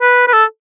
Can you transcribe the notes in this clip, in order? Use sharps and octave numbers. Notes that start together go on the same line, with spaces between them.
B4
B4
A4